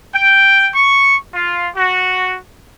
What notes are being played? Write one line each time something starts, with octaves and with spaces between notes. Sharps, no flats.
G5
C#6
F4
F#4